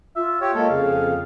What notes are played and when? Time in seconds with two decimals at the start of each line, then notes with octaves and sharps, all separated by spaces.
0.16 F4 E5
0.41 G4 C#5
0.54 G#3 A#3 A4
0.70 F2 C#3 G#4 F5